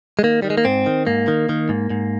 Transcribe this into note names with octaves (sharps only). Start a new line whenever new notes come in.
G#3
D#3 A#3
D#3 G3
G#3
A#3
G#2 C4
D#3
G#2 A#3
D#3
D#3
G#2
G#2